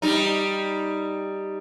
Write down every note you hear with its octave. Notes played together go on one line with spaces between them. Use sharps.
G3 D#4